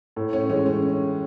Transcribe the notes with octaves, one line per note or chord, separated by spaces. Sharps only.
A2
C#4
E3 G#3 C#4
C#4